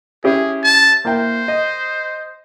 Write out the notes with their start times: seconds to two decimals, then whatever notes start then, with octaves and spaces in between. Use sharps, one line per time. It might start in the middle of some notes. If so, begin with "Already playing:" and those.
0.24 C#4 E4 G4 G#4
0.63 A5
1.05 A#3 E4 C5 G5
1.48 D#5